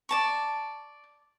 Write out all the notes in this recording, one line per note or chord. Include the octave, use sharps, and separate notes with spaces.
D5 A5 C#6